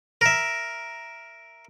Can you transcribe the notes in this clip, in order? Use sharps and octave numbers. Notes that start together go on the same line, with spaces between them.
A#4 E5